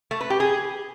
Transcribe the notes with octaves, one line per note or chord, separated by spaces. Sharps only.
A3
B4
G4
G#4